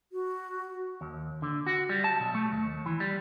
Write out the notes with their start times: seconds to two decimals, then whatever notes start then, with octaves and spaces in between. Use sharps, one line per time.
0.12 F#4
1.01 D#2
1.42 D3
1.67 F#4
1.89 G3
2.04 A5
2.20 B1
2.35 A3
2.52 D#2
2.86 E3
3.00 G3